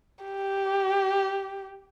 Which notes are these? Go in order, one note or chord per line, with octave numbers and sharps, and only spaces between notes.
G4